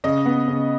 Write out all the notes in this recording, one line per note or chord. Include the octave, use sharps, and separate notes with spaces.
C#3 D#5
B3
C#3